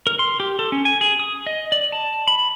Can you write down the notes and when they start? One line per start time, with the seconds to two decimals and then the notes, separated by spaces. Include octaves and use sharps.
0.07 A#4
0.19 C6
0.40 G4
0.59 A4
0.72 C#4
0.85 G#5
1.01 G#4
1.19 D#6
1.47 D#5
1.72 D5
1.92 A5
2.28 B5